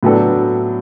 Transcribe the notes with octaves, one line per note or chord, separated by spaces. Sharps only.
A2 F#3 B3 D4 A4